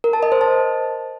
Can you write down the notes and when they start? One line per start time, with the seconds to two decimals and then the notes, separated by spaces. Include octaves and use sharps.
0.04 A#4
0.13 A5
0.23 D#5
0.32 C5
0.41 A5